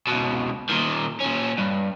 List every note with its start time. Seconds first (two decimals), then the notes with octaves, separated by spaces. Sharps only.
0.07 C#2 B2
0.70 A#2 D#3
1.20 A#2 C#4
1.57 G2